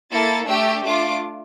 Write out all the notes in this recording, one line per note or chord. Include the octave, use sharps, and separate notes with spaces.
A#3 E4 A4 A6
A3 D4 G4 E6
A3 D4 F4 D6